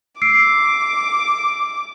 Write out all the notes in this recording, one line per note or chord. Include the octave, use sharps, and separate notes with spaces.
D6 E6 C7 D7